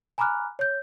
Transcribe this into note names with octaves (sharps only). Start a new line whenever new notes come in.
G#5 A#5 B5 D6 F6 F#6
C#5 G6